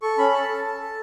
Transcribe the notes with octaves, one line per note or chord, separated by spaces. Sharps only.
A4 C#6
C#4 B5
A4 A5
A4
A4
A4